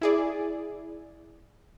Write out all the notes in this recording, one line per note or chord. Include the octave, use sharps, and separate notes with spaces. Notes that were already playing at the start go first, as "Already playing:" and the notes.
E4 G#4 D5